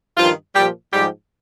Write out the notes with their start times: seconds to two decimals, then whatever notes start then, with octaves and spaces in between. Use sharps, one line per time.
0.17 G2 D#3 F3 F4
0.55 A#2 F3 G3 G4
0.93 G#2 F3 G3 G4